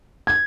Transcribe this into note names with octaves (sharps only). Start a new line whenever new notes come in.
G#6